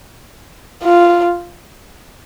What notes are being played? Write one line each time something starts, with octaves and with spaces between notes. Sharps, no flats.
F4